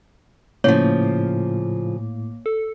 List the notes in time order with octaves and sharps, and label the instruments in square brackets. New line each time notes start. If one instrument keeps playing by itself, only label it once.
[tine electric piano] A2 [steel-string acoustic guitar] C#3 F3 [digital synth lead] A#3 [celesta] C#5
[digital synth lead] A4